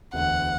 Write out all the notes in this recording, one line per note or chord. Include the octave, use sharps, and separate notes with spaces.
E1 D2 D3 F#5